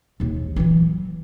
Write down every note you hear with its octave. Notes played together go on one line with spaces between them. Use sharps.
A#1 D#2
E3 F#3